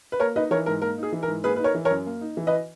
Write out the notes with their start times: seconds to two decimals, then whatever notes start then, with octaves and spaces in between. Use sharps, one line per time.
0.12 B4
0.19 A#3 A#4 C#5
0.36 D#4 B4 D#5
0.51 E3 A#4 C#5
0.66 G#2 A#4
0.82 A#3 A#4
0.98 D#4 G#4
1.12 E3
1.23 A#4
1.28 G#2
1.44 A#3 G#4 B4
1.56 D#4 B4
1.64 A#4 C#5
1.74 E3
1.85 A#4 C#5
1.91 F#2
2.06 A#3
2.21 D#4
2.37 E3
2.47 B4 D#5